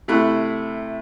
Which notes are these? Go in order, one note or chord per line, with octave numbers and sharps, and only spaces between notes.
C3 A3 E4 B5 F#6